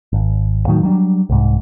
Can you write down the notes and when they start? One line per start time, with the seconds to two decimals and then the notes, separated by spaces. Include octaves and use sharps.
0.13 G#1
0.67 D#2 A2 D#3 F#3
0.83 F#3 G3 D4
1.30 C2 G#2